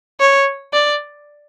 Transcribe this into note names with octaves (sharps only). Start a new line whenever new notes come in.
C#5
D5